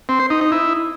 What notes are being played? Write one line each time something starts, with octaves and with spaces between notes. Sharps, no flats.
C4
C5
D#4
D#4
E4